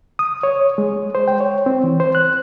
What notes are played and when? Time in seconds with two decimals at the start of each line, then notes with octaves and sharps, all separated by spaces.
0.19 D#6
0.43 C#5
0.78 G#3
1.15 C5
1.28 G5
1.41 C#5
1.66 C4
1.84 E3
2.00 C5
2.15 F#6